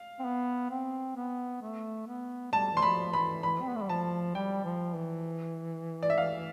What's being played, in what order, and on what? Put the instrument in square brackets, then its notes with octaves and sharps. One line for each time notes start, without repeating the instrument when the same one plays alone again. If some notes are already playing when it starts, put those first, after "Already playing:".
Already playing: [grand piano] F5
[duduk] C4
B3
C4
B3
A3
B3
[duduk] G3 [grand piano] A5
[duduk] E3 [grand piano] C6
[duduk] F3 [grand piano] B5
[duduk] E3 [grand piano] B5
[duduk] E3 [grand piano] B5
[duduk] C4
B3
A3
G3
[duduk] F3 [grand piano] A5
[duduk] G3 [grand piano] G5
[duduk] F3
E3
[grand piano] D5
E5
F5